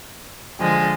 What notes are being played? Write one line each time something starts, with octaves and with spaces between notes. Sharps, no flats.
D3 F3 G#3